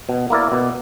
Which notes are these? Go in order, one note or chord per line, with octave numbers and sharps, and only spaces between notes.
B2
A#3 E4 A#4 D5
B2